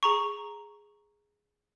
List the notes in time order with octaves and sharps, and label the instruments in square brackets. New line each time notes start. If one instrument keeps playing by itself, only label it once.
[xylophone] G#4 A#5 C#6